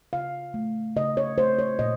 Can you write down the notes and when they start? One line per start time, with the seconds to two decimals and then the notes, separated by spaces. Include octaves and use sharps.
0.13 C#3 F5
0.54 A3
0.96 C#3 D#5
1.17 C#5
1.38 A3 C5
1.59 C#5
1.79 A#2 D#5